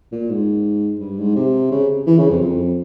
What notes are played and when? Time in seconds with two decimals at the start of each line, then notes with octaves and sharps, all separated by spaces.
0.12 A#2
0.29 G#2
1.00 G2
1.18 G#2
1.35 C3
1.71 C#3
2.06 E3
2.18 C#3
2.30 F2
2.41 F2